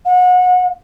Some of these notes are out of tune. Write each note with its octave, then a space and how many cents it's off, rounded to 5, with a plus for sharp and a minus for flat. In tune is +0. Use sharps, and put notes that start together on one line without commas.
F#5 -30